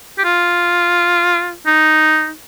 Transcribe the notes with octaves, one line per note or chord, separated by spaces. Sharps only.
G4
F4
D#4